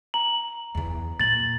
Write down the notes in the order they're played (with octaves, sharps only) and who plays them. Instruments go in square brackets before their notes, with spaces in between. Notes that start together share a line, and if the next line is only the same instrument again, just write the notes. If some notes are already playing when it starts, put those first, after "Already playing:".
[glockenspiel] A#5 F#7
[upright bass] E2 E3
[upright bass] A#2 [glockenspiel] A6 F#7